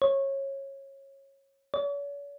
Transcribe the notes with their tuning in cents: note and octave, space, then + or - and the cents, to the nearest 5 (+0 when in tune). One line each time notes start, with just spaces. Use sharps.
C#5 -20
C#5 +45